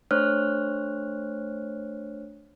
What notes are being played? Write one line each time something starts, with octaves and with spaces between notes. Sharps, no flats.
A3 D4 C5 C#5 F6 F#6